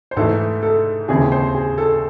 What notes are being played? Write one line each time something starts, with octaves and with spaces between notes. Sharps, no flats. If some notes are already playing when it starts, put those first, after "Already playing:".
C5
G#2 E3 A3 A4
A4
D#2 C#3 E3 C4 G#4
C5
G#4
A4